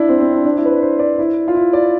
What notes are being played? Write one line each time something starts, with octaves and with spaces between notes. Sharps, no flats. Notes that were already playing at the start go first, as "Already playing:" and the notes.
Already playing: D4 E4
C4
C4
D4
D4
E4
B4
C5
C5
D5
E4
F4
E4
D5